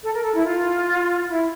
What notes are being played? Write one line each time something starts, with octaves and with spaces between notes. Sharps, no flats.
A4
A#4
A4
E4
F4
E4